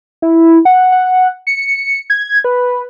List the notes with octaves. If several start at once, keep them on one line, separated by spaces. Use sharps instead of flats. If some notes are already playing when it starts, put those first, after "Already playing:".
E4
F#5
F#5
C#7
G#6
B4